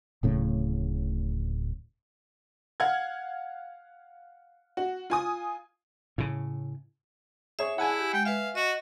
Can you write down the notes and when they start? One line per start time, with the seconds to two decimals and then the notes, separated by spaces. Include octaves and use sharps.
0.23 D1 A2 C#3
2.80 F5 F#5 F6 G#6
4.77 F#4
5.10 F4 G#5 D#6
6.18 A2 C#3
7.59 G#4 C#5 E5
7.78 E4 G#4 F#5 G#5 A5
7.99 G4
8.13 G#3 G5
8.25 B4 E5 F5
8.55 F#4 D#5